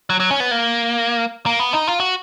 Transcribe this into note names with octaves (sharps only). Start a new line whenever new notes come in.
F#3
F#3
C#4
B3
A#3
A#3
B3
D#4
F4
F#4